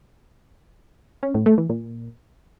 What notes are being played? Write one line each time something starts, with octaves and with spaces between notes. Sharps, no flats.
C#4
A2
A3
E3
A#2